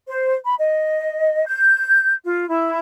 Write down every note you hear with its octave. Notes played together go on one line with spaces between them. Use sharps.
C5
B5
D#5
G6
F4
E4